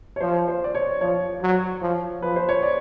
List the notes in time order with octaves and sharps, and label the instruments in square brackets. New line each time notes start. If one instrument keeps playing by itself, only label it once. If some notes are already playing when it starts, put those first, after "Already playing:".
[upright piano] C#5
[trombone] F3 [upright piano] C5
[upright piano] C5
D5
C#5
[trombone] F3 [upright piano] C#5
[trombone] F#3
F3
[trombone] F3 [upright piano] B4
[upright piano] C5
C#5
D5